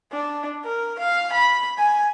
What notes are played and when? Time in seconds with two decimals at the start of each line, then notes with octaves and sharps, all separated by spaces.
0.12 D4
0.64 A#4
0.99 F5
1.32 B5
1.78 G#5